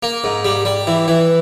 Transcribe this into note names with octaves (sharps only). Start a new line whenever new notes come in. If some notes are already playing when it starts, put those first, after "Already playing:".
A#3
G#2
G3
G3
E3
E3